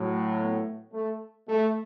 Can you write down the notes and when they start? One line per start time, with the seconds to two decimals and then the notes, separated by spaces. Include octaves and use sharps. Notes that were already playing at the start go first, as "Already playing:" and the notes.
Already playing: A2 F#3
0.39 B3
0.93 A3
1.48 A3